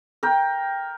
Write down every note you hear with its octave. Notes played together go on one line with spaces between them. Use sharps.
A#4 G5